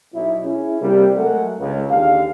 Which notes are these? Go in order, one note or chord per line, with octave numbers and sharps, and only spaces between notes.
B1 E4
C#4 E4 G#4
C3 G3 A#3
F#3 G#3 A3 A4 A#4 F#5
C#2
D#2 D3 G4 G#4 F5